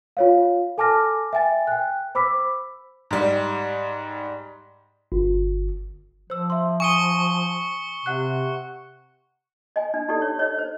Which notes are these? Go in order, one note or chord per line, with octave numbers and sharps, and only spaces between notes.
F4 C#5 F5
A4 G#5 A5 D6 F6 A#6
E5 G5 G#5 A6
G5 F#6
C5 B5 D6 E6 B6
G#2 G3
G1
F3 C5 E6
E5 C6
G#5 C#6 D#6 C#7 D#7 G7
C3 F#5 F#6
D#5 G#5
D4
D#4 G4 A4 D5
C#5
C#5 D#5
C5